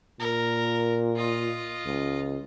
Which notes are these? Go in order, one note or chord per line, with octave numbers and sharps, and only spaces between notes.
A#2 A#4
F4 D#5
C#2